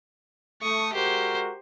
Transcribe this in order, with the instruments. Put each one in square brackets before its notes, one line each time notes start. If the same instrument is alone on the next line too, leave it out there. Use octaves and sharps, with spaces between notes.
[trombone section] A3 [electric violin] C#6 D#6
[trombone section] G#3 F#4 A#4 [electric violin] G4 C5